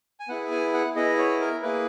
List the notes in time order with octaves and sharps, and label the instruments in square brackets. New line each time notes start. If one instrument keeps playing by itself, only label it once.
[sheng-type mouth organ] G#5
B3 E4 G#4 F#5
G#5
F#5
B3 E4 G#4 D#5
C#5
A#4
A#3 E4 G#4 B4